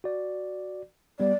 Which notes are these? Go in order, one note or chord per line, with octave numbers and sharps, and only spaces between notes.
F#4 D5
G3 B3 D5